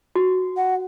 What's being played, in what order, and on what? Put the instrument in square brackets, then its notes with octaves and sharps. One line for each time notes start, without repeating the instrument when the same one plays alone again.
[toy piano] F#4
[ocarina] F#5